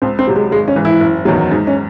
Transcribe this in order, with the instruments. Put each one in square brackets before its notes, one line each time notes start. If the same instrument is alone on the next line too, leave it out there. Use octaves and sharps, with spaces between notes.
[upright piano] C#2 [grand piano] C4
[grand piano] C4
[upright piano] C3 F#3
[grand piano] G#3
[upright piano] G#1 [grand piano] G#3
[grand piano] C#4
[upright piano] G#2 E3
[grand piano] E4
[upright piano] F#1
E2 D#3 F#3
[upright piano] G#2 [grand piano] D#4
[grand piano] C#4